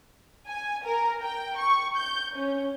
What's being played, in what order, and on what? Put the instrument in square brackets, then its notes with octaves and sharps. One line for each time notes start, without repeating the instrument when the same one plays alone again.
[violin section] G#5
A#4
G5
C#6
G6
C#4